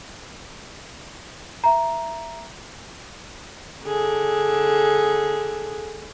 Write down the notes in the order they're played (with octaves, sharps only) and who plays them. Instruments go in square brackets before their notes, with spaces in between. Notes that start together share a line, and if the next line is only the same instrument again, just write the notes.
[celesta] E5 A#5
[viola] D3 G#4